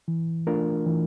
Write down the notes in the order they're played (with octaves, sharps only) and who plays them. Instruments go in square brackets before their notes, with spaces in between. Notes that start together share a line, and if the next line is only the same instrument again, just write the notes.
[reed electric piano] E3
A3 D4 F4 A#4
E3